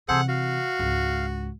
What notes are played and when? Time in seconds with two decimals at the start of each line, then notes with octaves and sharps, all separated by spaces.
0.09 C3 E3 G#4 A4 C5 F#5
0.29 F#4 F5
0.79 C#2 G#2